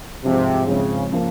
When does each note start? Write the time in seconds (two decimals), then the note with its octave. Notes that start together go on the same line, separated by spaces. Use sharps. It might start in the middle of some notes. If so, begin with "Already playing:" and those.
0.24 G#2 C3 F3 C4
0.67 G#2 C#3 F3 C4
1.11 C#3 F3 A#3